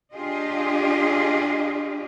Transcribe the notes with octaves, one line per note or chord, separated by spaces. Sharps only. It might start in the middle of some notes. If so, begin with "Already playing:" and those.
D4 F4 G4 G#4 D#5